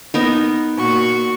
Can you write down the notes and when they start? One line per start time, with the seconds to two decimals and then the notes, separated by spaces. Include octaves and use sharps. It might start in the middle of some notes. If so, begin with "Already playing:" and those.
0.14 B3 D#4 A#4
0.79 A#2 F#4 C#6